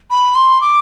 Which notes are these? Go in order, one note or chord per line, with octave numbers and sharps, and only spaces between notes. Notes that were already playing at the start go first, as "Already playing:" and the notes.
B5
C6
D6